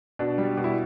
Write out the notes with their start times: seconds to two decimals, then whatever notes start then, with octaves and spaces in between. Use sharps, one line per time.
0.19 B2 D4
0.38 G3
0.57 B2
0.64 E4